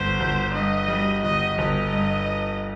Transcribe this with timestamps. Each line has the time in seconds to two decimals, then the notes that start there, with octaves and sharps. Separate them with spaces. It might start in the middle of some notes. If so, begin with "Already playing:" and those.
Already playing: G1 C5
0.20 G1
0.54 G2 D#5
0.88 G3
1.24 G1 D#5
1.58 G1 D#5
1.92 G2